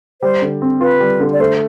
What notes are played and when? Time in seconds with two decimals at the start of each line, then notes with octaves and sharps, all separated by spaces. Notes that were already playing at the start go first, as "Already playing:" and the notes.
0.22 G3 C5
0.42 D3
0.62 C4
0.81 F4 B4
1.00 G3
1.20 D3
1.33 D5
1.40 A3 C5